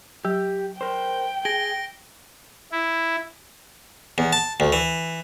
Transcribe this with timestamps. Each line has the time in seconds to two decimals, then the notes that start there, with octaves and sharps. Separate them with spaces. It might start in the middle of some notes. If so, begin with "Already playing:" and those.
0.25 F#3 G4
0.81 A#4 C5 G5
1.45 G#4 A#6 D7 G7
2.72 E4
4.18 E2
4.33 A5
4.60 D2
4.72 E3